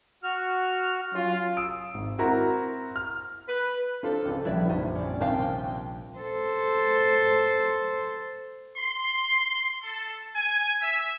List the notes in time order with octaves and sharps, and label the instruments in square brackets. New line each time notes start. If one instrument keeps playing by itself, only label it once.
[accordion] F#4 F6
[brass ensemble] F#3 C#4 F4
[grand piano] D#6 E6 D7
G#1
C4 E4 F#4 A#4 A#5
F6
[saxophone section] B4
[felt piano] D4 F4 C5 [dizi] A4
[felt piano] C#2 C#3
[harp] A#1 G3 [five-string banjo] E4 B4 D5 [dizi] E5
[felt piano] F#1 [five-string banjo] D#4
[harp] C4 C#4 [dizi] D5
[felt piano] D#2 C3 [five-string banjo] A#4 C5 F5 [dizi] G5
[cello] A4 C5
[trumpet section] C6
A4
G#5
E5